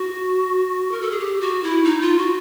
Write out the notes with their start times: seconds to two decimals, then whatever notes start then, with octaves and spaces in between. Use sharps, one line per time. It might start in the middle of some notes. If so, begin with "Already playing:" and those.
Already playing: F#4
0.91 A#4
1.01 A4
1.11 G#4
1.20 G4
1.41 F#4
1.63 E4
1.84 D#4
2.01 F4
2.18 F#4